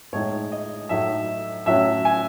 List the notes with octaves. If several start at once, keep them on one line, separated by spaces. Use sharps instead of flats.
A2 G#3 D#4 C#5
D#5
A2 F#3 A3 D#4 E5
A2 F#3 C#4 E5
G#5